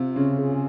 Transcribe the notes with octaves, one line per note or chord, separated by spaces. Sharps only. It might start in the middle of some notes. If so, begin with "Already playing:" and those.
Already playing: C3 F4
C#3 C#4
G#4